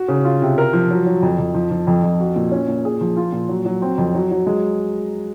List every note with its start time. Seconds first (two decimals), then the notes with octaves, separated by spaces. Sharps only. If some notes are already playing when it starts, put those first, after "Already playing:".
Already playing: F#4
0.08 C#3
0.25 F4
0.42 C3
0.58 A#4
0.73 F3
0.91 F#3
1.06 F#3
1.22 F2
1.39 F2
1.54 F3
1.71 F3
1.87 F2
2.03 F2
2.20 F#4
2.36 A#2
2.52 C#4
2.68 A#2
2.85 G#4
3.01 F3
3.17 F4
3.32 A#2
3.49 F#3
3.65 F#3
3.82 C4
3.98 F2
4.14 F#3
4.31 F#3
4.46 G#3